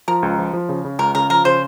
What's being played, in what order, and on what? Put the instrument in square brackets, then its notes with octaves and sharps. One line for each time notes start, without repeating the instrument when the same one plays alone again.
[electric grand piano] F3 [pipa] A#4
[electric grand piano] C#2
F3
F3
C#3
C#3
[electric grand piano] C#2 [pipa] A#4
[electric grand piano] C#3 [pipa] A#4
[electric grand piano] F3 [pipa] A#4
[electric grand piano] C#3 [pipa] C5